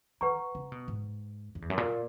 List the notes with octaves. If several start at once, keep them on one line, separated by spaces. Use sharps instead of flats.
D#3 B4 F#5 A#5 C#6
C#3
B2
G#2
F#2
E2
F#2
A#2